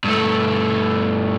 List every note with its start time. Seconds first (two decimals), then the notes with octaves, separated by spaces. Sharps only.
0.04 G2 A3